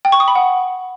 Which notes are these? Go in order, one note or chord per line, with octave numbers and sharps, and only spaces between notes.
G5
C#6
D#6
B5
F#5